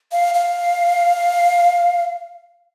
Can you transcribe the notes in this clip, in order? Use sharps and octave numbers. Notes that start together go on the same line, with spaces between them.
F5
F5